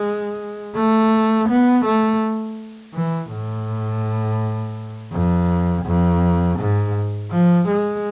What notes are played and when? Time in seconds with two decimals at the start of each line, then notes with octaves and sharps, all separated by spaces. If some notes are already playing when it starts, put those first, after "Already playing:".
Already playing: G#3
0.75 A3
1.49 B3
1.85 A3
2.94 E3
3.31 A2
5.13 F2
5.85 F2
6.59 G#2
7.31 F3
7.68 G#3